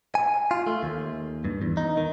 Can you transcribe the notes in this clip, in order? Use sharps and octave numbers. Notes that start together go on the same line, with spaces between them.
G#5
F4
A3
D#2
G2
E2
D#4
D#3